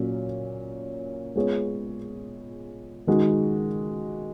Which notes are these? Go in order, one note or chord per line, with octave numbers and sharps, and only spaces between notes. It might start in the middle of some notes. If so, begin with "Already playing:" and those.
Already playing: A#2 F#3 A#3 C#4
G#3 B3 F4 G#4 C#5
D#3 G#3 D#4 F#4